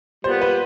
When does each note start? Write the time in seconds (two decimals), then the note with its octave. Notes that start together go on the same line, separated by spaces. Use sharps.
0.24 A#2 G3 B3 C5
0.42 B4